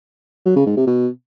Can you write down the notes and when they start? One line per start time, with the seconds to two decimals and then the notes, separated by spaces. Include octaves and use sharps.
0.46 F#3
0.56 C#3
0.66 G#2
0.77 C3
0.87 B2